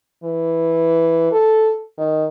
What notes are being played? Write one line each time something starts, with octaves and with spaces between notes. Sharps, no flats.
E3
A4
D#3